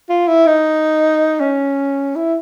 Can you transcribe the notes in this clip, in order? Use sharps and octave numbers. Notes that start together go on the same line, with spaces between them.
F4
E4
D#4
C#4
E4